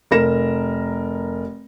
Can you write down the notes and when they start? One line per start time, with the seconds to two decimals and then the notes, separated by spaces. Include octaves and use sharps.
0.11 F1 A#4 A#6 E7